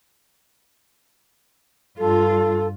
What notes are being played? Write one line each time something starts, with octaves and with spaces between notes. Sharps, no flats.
G2 F4 A4